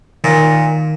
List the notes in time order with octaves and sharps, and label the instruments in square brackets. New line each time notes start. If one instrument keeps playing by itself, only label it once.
[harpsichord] A#2 [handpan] D#3